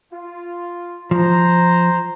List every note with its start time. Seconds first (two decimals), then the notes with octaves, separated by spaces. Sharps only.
0.13 F4
1.11 F3 C5 A#5